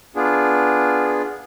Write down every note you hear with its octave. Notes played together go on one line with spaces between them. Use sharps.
B3 D4 F4 G#4